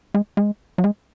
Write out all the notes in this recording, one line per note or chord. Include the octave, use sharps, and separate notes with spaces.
G#3
G#3
F#3
G#3